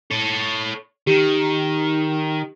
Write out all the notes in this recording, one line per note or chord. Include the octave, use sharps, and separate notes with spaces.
A4 C#5
D#3 G4